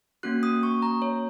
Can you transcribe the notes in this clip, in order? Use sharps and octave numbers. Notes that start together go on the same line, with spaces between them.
A#3 C#4 F#4 F#6
D#6
C#6
A#5
C#5